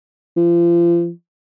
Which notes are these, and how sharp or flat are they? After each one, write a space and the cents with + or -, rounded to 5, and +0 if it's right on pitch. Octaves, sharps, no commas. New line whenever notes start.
F3 -35